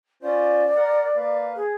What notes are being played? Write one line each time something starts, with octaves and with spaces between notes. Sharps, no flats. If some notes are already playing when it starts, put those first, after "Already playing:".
C#4 F4 C5 D5
A#4 F#5
A#3 B4 F5
G#4